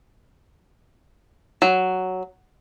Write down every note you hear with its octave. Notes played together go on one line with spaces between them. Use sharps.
F#3